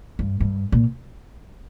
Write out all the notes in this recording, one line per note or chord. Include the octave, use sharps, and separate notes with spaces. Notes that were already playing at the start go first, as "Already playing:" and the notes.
G2
G2
A#2